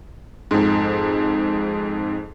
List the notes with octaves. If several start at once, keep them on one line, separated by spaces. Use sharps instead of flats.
F2 G#2